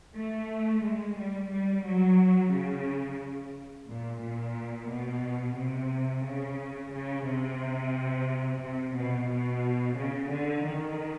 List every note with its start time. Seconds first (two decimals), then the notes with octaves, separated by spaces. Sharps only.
0.16 A3
0.84 G#3
1.17 G3
1.51 G3
1.85 F#3
2.52 C#3
3.88 A#2
4.22 A#2
4.90 B2
5.57 C3
6.25 C#3
6.92 C#3
7.26 C3
8.61 C3
8.95 B2
9.29 B2
9.97 C#3
10.30 D3
10.64 D#3